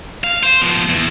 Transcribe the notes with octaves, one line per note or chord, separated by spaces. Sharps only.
F5
C5
F3 B3
E2